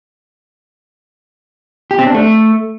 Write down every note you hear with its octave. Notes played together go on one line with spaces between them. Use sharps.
G4
C4
D4
A3